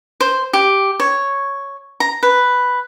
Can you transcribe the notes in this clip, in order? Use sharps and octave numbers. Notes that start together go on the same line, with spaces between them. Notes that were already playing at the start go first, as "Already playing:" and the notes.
C5
G4
C#5
A#5
B4